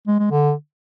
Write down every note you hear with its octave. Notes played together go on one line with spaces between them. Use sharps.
G#3
G#3
D3